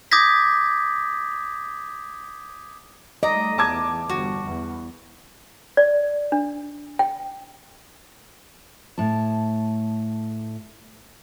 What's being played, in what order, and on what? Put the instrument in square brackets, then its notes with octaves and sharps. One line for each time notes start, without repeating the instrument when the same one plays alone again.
[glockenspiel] D6 D#6 G6 G#6 A#6 B6
[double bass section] G3 A3 [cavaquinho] D5 A#5 [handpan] D#5
[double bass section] E2 [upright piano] A5 D6 G#6
[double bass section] G1 G3 [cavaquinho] F#4
[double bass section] E2
[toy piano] D5
D4
G5
[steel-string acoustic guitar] A2 A5